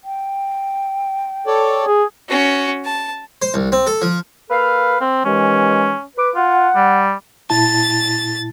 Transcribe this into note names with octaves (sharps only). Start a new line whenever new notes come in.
G5
A4 C#5 D5
G#4
C#4 F#4
A5
C5
C2
C4
A4
F3
A#3 A4 B4 F5
C4
D#2 E3 G#3 C#4
B4 D6
F4 F#5
G3
A#2 E4 A5 A6